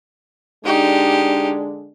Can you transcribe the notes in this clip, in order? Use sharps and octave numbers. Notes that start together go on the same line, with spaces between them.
D3 G#3 D4 D#4 G4